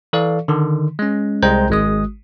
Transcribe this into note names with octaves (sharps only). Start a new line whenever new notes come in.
E3 A4 D5 F5
D3 D#3
G#3 C#4
C2 G#3 C5 G5 A#5 G6
G#1 G#3 D#6